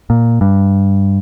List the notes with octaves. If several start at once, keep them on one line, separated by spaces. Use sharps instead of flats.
A#2
G2